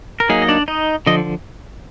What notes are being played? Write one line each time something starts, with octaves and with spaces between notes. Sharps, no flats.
A#4
F#3 A#3 D#4 G#4
D#5
D4 D5
D#4 D#5
D3 F3 D#5